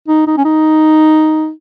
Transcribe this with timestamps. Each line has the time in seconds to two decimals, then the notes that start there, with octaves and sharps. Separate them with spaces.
0.08 D#4
0.27 D#4
0.38 C#4
0.45 D#4